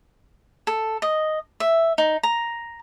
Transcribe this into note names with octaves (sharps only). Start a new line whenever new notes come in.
A4
D#5
E5
D#4
A#5